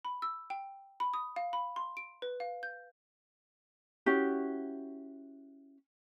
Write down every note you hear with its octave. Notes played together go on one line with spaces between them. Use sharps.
B5
E6
G5
B5
D#6
F5
B5
C6
D7
B4
F5
G6
C#4 E4 F#4 G4